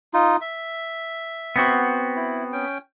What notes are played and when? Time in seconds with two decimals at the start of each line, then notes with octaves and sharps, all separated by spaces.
0.14 D#4 F4
0.41 E5
1.56 B3 C4 F#4
2.16 E4
2.52 C#4 G5